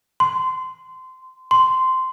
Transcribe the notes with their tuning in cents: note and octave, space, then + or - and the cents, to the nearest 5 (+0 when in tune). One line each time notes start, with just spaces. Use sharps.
C6 -20
C6 -10